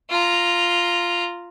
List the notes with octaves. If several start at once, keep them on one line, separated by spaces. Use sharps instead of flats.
F4 A#5